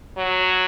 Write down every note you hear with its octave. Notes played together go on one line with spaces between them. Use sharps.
F#3